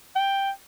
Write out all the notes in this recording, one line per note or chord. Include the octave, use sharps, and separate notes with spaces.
G5